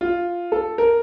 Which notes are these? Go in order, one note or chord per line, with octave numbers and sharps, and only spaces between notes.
F4
A4
A#4